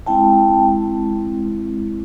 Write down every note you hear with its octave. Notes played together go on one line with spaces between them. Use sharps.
G#3 C4 E4 G5 A5